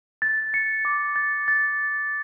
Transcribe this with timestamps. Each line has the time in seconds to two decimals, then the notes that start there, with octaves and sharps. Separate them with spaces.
0.22 A6
0.54 C#7
0.85 D6
1.16 A6
1.48 A6